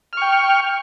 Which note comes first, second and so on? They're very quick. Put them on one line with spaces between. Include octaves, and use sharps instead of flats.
F6 C#6 G5